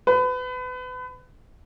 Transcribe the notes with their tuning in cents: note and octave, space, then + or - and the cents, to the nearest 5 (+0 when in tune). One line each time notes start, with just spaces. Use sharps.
B4 +30